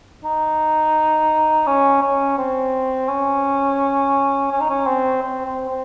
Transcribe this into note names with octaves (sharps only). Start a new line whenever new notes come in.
D#4
C#4
C#4
C4
C#4
C#4
D#4
C#4
C4
C4
C4
C4